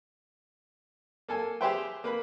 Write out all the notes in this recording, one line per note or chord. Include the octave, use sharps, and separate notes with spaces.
A#3 A4 G#5
G4 G#4 B4 C5 E5 G5
A#3 B4 B5